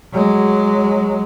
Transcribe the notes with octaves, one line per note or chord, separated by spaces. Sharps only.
F#3 G#3